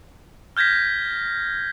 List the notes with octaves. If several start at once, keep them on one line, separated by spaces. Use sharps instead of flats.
F6 G6 G#6 A#6 B6